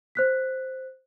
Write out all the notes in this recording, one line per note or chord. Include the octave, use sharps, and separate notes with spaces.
C5 F#6 B6